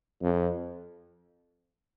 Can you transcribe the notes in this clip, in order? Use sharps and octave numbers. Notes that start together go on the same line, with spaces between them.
F2